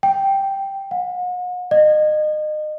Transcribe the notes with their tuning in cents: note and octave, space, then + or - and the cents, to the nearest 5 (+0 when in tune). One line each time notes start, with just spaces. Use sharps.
G5 -5
F#5 -45
D#5 -30